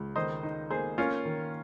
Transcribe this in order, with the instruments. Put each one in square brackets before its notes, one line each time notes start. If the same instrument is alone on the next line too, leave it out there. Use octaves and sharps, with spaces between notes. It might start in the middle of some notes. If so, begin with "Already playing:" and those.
Already playing: [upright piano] C#2
[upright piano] D#3 [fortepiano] C5 D#5
[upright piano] D#4
[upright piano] A#3 [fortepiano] G#4 C5
[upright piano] A#3 [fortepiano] C#4 F4
[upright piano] D#3